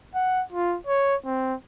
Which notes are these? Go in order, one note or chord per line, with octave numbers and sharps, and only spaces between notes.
F#5
F4
C#5
C4